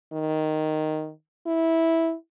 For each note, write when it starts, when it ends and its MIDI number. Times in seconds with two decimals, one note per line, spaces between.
0.13 1.10 51
1.46 2.14 64